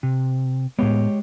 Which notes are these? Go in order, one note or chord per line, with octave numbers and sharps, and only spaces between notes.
C3
A2 G#3 B3 G4 C#5